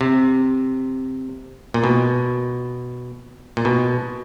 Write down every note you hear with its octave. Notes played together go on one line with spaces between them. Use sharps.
C3
A#2
B2
A#2
B2